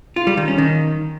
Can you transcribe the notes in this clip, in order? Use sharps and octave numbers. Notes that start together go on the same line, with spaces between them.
F4
G3
D#3
C#4
D#3